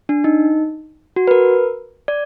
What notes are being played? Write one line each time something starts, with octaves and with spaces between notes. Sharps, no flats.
D4
D#4
F#4
B4
A#4
D5